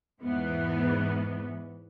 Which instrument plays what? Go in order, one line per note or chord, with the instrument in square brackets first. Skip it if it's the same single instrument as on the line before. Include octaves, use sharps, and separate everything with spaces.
[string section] E2 G#2 E3 B3